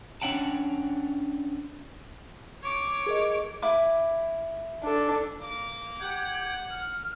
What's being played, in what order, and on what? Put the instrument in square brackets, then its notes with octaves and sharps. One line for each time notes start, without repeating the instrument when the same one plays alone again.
[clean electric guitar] C#4 D4 C#5 F#5 G5 A5
[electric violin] C#5 D6
[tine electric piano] G#4 A#4 D#5
[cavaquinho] E4 D6
[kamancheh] D4 A4
[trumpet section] A#3 D6
[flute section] G4 G6 G#6 [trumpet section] F#5
[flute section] F6